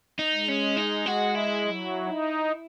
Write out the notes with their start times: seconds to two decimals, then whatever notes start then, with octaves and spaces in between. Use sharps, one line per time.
0.19 D#4
0.33 G#3
0.49 C#4
0.77 D#4
1.06 F#4
1.35 E4
1.64 F#3
2.07 D#4